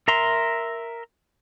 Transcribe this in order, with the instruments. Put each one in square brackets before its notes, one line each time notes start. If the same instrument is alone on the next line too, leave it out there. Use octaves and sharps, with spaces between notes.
[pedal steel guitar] A#4 E5 A#5 C6